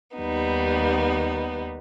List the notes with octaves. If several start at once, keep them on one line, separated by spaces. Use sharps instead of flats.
D#2 G3 B3 D#4